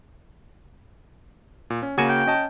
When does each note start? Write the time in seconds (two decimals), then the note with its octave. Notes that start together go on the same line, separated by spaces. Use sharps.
1.70 A#2
1.82 C#4
1.98 C#3 A#3 F#4 G#5
2.09 G5
2.26 C#4 D#5 A5